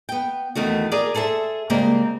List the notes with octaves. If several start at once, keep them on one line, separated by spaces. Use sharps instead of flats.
B3 G5
E2 D#3 A3 F#4
G#4 A#4 D5
G#4 A4 C5 E5
C#3 G3 G#3 A#3 C4